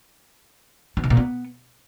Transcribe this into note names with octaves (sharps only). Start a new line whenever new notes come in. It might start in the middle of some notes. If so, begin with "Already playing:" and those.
B3
C#3
A#2
B3